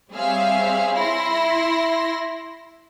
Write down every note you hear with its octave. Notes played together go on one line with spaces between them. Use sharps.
G3 C4 G#4 C#5 E5 F5
E4 C6 A#6